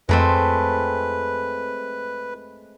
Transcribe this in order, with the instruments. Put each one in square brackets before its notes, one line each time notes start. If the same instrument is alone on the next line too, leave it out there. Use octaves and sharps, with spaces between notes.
[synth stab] F2 [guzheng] G#3 A3 C4 [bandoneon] B4